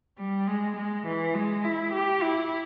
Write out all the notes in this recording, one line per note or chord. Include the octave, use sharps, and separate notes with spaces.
G3
G#3
G#3
E3
G#3
E4
G4
E4